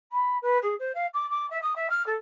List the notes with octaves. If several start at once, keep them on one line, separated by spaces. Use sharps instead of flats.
B5
B4
G#4
C5
F5
D6
D6
E5
D#6
E5
F6
A4